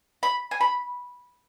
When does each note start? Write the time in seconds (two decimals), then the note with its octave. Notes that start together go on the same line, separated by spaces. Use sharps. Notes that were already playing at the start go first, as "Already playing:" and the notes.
0.23 B5
0.51 G#5
0.61 B5